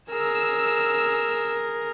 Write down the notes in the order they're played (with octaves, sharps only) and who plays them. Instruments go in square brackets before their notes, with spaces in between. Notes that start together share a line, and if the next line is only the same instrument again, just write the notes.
[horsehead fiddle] G#4 A#4 [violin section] E6